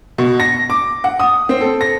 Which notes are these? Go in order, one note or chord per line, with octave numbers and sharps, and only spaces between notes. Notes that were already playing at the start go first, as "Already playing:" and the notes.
B2
A#6
D6
F#5
D#6
C4
A4
A#6